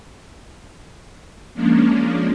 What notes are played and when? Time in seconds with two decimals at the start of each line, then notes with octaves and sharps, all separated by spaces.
1.54 F3 G#3 A#3 C#4 D4